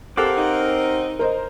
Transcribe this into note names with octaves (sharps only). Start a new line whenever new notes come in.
C4 G4 A4 A#4 F5 F#5 D6
D#4
A#4 C5 D#5